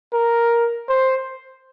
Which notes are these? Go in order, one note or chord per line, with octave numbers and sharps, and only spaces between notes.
A#4
C5